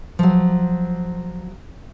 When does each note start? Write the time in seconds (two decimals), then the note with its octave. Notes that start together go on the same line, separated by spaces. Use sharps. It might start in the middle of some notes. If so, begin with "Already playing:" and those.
0.19 F3 F#3